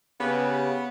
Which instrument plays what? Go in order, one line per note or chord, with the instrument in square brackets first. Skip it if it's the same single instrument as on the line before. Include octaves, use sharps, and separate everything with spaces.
[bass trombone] C#3 [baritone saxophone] B3 [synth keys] G4 B4